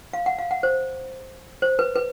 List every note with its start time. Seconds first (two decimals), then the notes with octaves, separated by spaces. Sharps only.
0.13 F5
0.26 F#5
0.38 F5
0.51 F#5
0.63 C5
1.62 C5
1.79 B4
1.95 B4